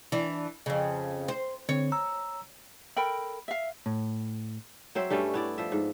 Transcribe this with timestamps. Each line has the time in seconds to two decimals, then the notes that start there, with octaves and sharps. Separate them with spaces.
0.12 E3 D4
0.66 F2 C#3
1.28 C5
1.69 D3 C4 C#5
1.92 A#5 E6
2.97 A4 A#4 G5 B5
3.48 E5 F5
3.86 A2
4.95 F#3 C4 C5 E5
5.10 G2 G3 A3 C#4
5.34 B3 E4 D5
5.58 F3 E5
5.72 G#2